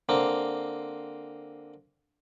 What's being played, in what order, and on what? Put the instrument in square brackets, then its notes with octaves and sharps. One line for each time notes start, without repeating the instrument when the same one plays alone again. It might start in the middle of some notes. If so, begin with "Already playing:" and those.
[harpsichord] D3 A#3 C4